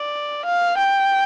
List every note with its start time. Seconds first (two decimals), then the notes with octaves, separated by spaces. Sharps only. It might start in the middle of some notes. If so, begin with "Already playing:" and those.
Already playing: D5
0.45 F5
0.77 G5